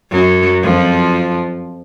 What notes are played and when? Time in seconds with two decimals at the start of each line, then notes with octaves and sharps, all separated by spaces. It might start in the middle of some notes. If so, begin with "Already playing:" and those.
0.12 F#2 F#3
0.63 F2 F3